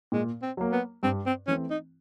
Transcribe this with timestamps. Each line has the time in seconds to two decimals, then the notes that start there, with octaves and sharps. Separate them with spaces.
0.12 A#2 G#3
0.43 C4
0.57 F#3 A#3
0.72 B3
1.03 G2 C4
1.26 C4
1.48 E3 A3 C4 C#4
1.71 D#4